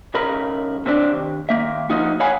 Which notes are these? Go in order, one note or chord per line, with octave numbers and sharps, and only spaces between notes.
B1 C#3 A#4 A#5 B5
C3 C4 D4
D#2
D#3 A#3 E5
F3 A#3 D#4 F#4
C#5 F5 F#5 G#5 B5